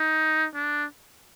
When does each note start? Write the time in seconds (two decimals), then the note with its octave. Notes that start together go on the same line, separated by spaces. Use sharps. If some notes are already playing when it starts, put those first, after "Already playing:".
Already playing: D#4
0.55 D4